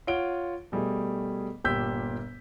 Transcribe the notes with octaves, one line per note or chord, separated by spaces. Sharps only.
F4 C#5 F#5 D7 G7
B2 G3 A3 G#4
G1 A#2 G4 E6 G6 B6